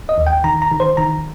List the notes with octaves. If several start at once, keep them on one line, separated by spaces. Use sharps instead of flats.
D#5
D#2
G5
D#3 A#5
A#5
D#3
C5
D#3 A#5